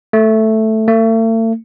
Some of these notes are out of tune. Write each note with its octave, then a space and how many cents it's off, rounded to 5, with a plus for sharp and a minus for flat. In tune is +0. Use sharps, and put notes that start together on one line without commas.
A3 +0
A3 +40